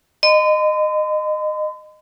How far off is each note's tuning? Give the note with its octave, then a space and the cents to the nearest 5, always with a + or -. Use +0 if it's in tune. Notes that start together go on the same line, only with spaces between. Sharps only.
D#5 -20 C6 -45